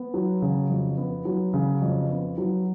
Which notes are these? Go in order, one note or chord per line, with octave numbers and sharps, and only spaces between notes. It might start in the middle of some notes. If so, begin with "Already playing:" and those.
Already playing: B3
F#3
C#3
F2
B3
F#3
C#3
F2
B3
F#3